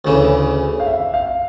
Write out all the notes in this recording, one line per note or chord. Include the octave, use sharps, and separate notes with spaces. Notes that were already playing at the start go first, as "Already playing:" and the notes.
D2 C#3 E3
F5
E5
F5